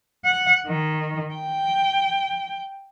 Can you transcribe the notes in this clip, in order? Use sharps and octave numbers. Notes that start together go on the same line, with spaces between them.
F#5
D#3
G5